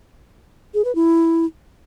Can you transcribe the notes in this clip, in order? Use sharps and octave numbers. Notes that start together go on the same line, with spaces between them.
G#4
B4
E4